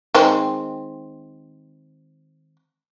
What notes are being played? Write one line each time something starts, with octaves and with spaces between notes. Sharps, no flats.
D#3 G#3 C4